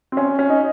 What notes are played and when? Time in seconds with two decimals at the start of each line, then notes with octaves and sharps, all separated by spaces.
0.12 C4
0.17 C#4
0.39 C#4
0.50 D#4